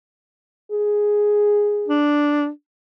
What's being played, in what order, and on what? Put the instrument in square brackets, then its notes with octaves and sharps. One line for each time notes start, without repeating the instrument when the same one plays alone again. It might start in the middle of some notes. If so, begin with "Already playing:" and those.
[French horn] G#4
[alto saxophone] D4